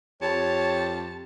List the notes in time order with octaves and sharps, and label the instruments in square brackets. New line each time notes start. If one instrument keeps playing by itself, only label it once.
[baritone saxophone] F2 [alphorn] G4 [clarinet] C#5 [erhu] A5